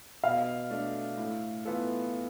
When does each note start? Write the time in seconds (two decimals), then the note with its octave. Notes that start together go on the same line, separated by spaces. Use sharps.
0.24 B2 F5
0.71 A3 D4
1.18 A2
1.65 E3 B3 F4 A4